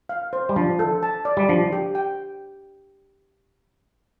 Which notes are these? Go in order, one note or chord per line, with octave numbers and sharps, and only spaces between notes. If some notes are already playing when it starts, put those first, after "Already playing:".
F5
C5
G3
F3 D4
A4
A5
D5
G3
F3 D4
G4
G5